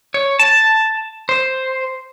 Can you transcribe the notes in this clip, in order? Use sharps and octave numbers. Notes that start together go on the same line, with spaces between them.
C#5
A5
C5